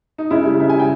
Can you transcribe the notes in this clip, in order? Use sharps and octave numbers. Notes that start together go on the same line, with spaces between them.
D#4
C#3 E4
G3
C#3 E5
G#5
G3
G5